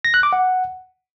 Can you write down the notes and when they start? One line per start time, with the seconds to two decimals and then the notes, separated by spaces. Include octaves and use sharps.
0.05 A#6
0.14 F#6
0.23 D6
0.33 F#5